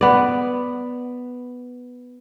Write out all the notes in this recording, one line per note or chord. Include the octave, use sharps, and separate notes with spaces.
B3 D5